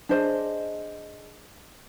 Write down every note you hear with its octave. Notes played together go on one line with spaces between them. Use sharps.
D4 G#4 C5 D#5